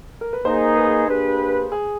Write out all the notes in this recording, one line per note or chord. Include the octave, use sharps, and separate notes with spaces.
A#4
B4
A#3 D#4 G#4 C5
B4
A#3 D4 G4 G#4 B4
G#4